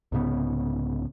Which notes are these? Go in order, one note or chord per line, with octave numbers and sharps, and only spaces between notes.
C2 G#2 C#3 B3